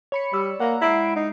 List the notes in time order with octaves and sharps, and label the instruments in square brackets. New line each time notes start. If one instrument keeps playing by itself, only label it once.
[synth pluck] C#5 B5 C#7
[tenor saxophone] G3 [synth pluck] D5 E6
[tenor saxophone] A#3 [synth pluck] F#5 A#5
[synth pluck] G#3 C7 D7 [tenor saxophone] E4
[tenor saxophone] D#4